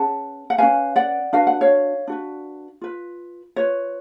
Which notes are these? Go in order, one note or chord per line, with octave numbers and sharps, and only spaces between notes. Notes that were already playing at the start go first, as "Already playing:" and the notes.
Already playing: C#4 G#4 B4 F#5 A5
F#5
C#4 G#4 B4 F5 G#5
D5 F#5
D4 F#4 B4 F5
F#5
C#5 F5
D4 F#4 B4
F4 B4
F4 B4 C#5